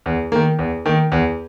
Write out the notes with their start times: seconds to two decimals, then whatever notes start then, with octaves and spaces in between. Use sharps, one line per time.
0.06 E2
0.32 D#3 A#3
0.59 E2
0.86 D#3 A#3
1.12 E2